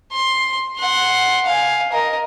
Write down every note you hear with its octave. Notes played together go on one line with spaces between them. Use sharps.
C6
F#5 C6
F5 G#5
A#4 D#5